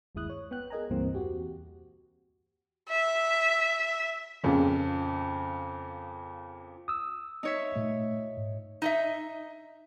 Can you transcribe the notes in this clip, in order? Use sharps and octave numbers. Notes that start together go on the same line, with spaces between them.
G1 D#2 G#3 E4 D#6 F#6
C#5
B3 G5 F#6
G#4 A#4 D#5 G#5 A#5
C#2 G2 A#2 E3 A#3 C4
E2 F#4 G4
E5
F2 A#2 C#3
D#6 E6
D#4 C#5 E5
A#2 A3
G#2
D#4 D#5 E5